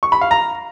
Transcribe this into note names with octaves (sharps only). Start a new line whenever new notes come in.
C#6
B5
F5
A#5